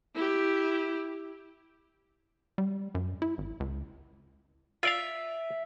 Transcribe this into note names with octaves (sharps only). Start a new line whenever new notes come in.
E4 G4
G3
F#2
E4
G#1
C#2
F4 D5 E5 F5